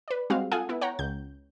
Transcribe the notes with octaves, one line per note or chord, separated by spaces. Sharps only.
B4 D5
G3 G#3 C4 F#4 F5
F4 A4 F5 F#5 G#5 D#6
B3 E4
C#5 F#5 G5 A#5
C#2 G6